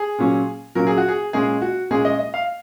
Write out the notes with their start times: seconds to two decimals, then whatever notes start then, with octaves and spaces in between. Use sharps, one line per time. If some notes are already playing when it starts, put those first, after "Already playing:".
Already playing: G#4
0.18 A#2 F#3 C#4
0.75 A#2 F#3 C#4 A#4
0.87 G#4
0.98 F#4
1.08 G#4
1.33 A#2 G#3 C#4 G#4
1.62 F#4
1.90 A#2 G#3 C#4 G#4
2.05 D#5
2.19 D#5
2.34 F5